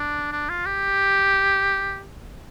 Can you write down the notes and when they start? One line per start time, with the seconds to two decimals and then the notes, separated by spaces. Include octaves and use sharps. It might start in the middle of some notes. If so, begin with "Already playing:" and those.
Already playing: D4
0.32 D4
0.49 F4
0.66 G4